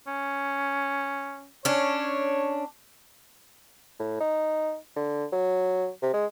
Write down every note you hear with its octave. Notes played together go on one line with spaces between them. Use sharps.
C#4
C#4 D4 C#5
A2
D#4
D3
F#3
C3
G#3